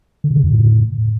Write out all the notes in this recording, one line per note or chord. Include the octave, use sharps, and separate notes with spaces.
D3
C3
C#3
F2
A2